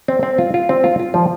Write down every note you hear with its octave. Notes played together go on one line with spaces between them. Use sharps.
C4
C4
F4
F4
C4
F4
F4
F3